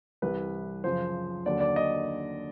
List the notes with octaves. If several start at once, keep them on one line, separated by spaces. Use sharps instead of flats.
C2 C3 E3 B4
F#2 C#3 F3 C5
D#2 D3 F#3 D5
D5
D#5